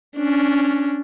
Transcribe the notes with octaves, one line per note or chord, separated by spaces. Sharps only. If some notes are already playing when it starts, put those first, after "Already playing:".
C#4 D4